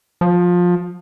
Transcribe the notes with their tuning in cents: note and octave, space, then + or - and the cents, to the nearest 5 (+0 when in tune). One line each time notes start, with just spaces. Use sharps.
F3 +20